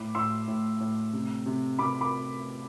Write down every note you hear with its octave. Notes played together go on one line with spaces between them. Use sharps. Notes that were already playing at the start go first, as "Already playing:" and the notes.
Already playing: A2 B5 D6
A2 C6 E6
A2
A2
C3
C3
C3 B5 D6
B5 D6